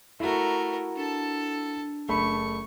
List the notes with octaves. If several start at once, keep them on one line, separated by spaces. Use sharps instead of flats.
A3 E4 F#4 A#4
D4 A4 A5
F#1 A3 B5 C#6